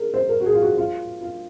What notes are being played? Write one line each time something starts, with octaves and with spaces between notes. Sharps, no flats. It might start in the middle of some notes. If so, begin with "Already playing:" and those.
Already playing: G#4 A#4
C5
A#4
F#4
G#4
F4
F#4
F4
F4